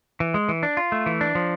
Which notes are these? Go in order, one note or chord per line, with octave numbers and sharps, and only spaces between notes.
E3
G#3
E3
D4
F4
A3
E3
D4
F3